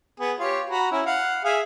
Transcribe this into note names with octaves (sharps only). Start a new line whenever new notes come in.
B3 G#4
F4 G4 C#5
F#4 A#5 B5
C#4 E4
F5 F#5
G#4 E5 F5